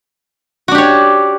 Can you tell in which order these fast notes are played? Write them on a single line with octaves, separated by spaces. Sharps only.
F#4 D4 G4 C#5